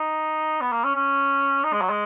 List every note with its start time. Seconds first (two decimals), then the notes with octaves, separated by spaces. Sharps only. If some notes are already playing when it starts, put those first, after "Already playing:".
Already playing: D#4
0.61 B3
0.72 A#3
0.84 C#4
0.95 C#4
1.64 D#4
1.73 G#3
1.81 F#3
1.90 G#3